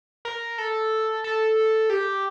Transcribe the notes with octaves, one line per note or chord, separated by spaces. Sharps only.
A#4
A4
A4
G4